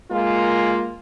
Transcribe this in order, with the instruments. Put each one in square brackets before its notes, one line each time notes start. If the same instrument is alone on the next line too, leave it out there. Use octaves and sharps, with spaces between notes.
[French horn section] G#3 A#3 F4